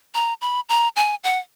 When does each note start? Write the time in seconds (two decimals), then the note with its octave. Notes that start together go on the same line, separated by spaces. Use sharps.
0.15 A#5
0.41 B5
0.69 A#5
0.96 G#5
1.24 F#5